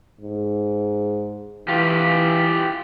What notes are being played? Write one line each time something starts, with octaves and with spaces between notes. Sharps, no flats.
G#2
E3 F4 G4